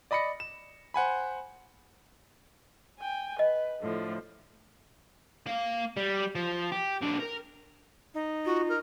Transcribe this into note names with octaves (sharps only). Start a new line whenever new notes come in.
D5 D#5 B5 A#6 C#7
E7
C5 F#5 G#5 B5
G5 G#5
B4 D#5
A2 D3 F3
A#3 F5
G3
F3
G4
B1 D4
A#4
D#4
F4 F#4
A#4